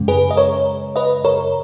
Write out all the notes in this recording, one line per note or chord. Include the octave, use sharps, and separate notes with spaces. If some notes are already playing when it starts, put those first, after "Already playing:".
Already playing: F#2 C#3 G#3
G#4 B4
D#5
A#4 C#5
B4 D#5
A#4 C#5